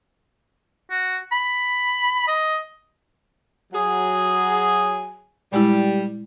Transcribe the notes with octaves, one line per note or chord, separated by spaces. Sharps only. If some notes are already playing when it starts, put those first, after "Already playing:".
F#4
B5
D#5
F#3 G#4
A#2 G3 G#3 E4